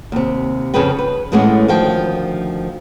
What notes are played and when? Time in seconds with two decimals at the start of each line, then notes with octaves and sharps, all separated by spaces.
0.12 D#2 C3
0.74 F2 C#3 C4 G#4 B4 G5
0.99 B4
1.32 A2 E3 G#3 A3 B3 C#4
1.68 D2 D#3 F3 G5